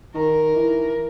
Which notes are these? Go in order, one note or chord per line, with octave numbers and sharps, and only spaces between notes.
D#3 A#4
E3